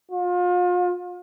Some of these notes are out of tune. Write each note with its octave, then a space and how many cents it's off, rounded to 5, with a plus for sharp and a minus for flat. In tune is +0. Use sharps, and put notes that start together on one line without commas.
F4 +35